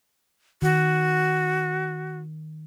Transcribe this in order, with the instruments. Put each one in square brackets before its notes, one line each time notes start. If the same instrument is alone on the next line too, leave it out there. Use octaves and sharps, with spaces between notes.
[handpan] D#3 [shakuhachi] F#4